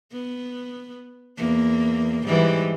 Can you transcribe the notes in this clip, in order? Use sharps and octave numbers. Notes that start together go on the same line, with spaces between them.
B3
E2 A#3
G#2 E3 G3